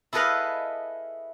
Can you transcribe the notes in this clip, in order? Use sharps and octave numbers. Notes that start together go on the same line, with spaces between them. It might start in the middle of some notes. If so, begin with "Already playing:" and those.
E4 G#4 A4 B4 D#5 F5